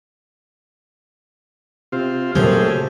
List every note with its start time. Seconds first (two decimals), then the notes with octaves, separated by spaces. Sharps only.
1.92 C3 C4 F4
2.35 F#2 A#2 C#3 F3 F#3 A3 G4 G#4